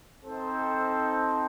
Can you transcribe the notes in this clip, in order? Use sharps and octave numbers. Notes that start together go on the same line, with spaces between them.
C4 D#4 A4 C5 G5